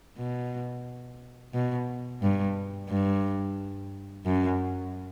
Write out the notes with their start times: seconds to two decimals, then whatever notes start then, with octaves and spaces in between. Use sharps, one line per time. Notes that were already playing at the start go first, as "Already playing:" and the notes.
0.17 B2
1.53 B2
2.22 G2
2.89 G2
4.26 F#2